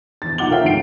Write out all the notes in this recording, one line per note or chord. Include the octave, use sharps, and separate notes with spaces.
E2 A6
B1 D#4 F4 F#5 D6 G7
F4 A#4 C#5 E5 F5 G5
F1 D2 G#2 F#5 C7 D7